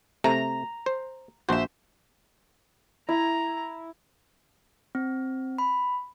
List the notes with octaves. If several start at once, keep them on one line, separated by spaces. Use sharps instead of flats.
C3 A3 A#5
C5
A#1 F#4 C5 E5
E4 A#5
C4
B5